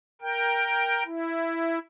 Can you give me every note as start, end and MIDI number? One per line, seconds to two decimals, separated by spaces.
0.22 1.03 70
0.22 1.03 79
1.07 1.79 64